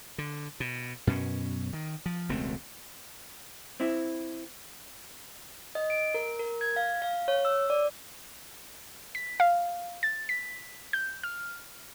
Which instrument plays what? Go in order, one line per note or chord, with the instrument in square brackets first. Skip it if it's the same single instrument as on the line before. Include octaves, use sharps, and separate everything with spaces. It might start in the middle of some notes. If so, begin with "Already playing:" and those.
[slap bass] D3
B2
F#2 B2 C#4
D#3
F3
E1 C#2 A3 C4
[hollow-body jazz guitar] C4 E4
[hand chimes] D#5
D7
A#4
A#4
G#6
F5
F5
C#5
E6
D5
[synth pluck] B6
F5
A6
B6
G6
F6